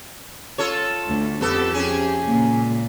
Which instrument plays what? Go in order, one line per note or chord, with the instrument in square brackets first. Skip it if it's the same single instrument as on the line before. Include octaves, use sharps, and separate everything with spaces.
[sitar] F4 A4 C#5
[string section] D2
[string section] F2 G4 [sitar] B3 A4
[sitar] C#4 G#4
[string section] C#2 A#2